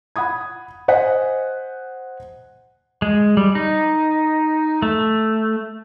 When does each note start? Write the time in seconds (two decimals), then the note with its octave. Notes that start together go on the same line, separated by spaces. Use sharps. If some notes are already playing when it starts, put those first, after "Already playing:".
0.16 F#5 B5 D#6 G#6
0.88 C5 D#5 F#5 G#5 F#6 B6
3.02 G#3
3.37 G3
3.55 D#4
4.82 A3